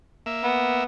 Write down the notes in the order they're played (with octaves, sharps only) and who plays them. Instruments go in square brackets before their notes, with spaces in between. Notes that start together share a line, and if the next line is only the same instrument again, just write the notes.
[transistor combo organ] A#3 E5
[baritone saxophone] B3